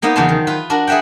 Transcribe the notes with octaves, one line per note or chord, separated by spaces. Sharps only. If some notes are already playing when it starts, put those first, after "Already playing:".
A#3 B3 D#4 C5 F5
E2 C#3 F#3 C5 A5 C6
D#3
F4 B4
D4 F#4 A#4
G#4 B4 E5 F#5 G5